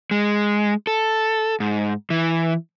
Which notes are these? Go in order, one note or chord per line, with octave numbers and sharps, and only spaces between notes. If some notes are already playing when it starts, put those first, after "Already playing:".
G#3
A4
G#2
E3